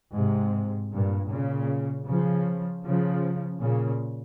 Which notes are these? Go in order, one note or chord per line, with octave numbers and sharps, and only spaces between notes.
G#2 C3
G2 A#2
A#2 C#3
C#3 F3
C#3 F3
A#2 C#3